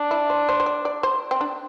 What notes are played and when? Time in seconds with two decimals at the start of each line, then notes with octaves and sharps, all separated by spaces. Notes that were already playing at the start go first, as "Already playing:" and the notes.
Already playing: D4
0.11 E4
0.30 C5
0.49 C5
0.60 C5
0.66 D5
0.85 D5
1.03 C5
1.31 C4
1.41 D4